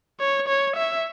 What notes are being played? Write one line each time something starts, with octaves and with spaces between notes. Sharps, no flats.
C#5
C#5
E5